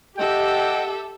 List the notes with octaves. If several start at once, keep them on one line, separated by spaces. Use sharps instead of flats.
G4 A4 D#5 E5 F#5 G5